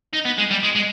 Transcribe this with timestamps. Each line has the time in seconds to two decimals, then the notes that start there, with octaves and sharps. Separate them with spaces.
0.13 D#4
0.25 B3
0.38 G#3
0.50 G3
0.63 G#3
0.75 G#3